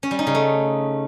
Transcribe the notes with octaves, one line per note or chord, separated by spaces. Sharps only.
C#4
G3
D#4
C#3
A3